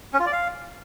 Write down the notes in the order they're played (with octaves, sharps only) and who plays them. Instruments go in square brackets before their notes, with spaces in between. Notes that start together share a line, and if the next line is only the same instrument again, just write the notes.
[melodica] C#4
F4
D5
F5